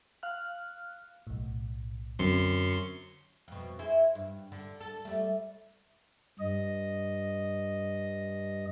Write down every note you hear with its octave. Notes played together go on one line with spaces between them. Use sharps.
F5 F6 F#6
B1 A2
F#2 D3 F#3 C4 C6 C#7
F2 B2
E4 G#4 C5
G2
D3
A4
G3 A3
G2 D#5